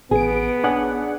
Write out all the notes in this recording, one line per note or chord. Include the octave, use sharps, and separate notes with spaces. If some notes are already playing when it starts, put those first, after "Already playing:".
A1 B3 G#4 D7
C#4 D4 G#4 F#5